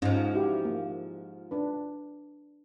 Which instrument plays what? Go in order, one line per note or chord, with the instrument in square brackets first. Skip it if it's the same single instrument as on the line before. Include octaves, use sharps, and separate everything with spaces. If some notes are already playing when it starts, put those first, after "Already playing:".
[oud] G#2 F3 [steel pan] C#4 D#4
[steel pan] E4 F#4 G4
A#3
D4 B4